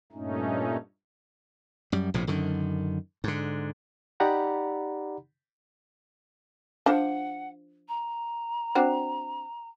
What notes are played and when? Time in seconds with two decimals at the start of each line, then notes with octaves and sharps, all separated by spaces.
0.12 G2 A#2 A3 C#4 D#4
1.92 F#2 G3
2.14 A#1 A2 C3 F3
2.27 F#2 D3 D#3
3.24 G#2 D3
4.20 D#4 G4 D5 F#5 A#5 B5
6.86 F3 D4 F#5 A5
7.88 A#5
8.75 C4 D4 F#4